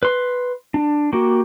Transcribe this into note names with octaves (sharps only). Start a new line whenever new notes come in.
B4 C6
D4
A#3 F#4 G4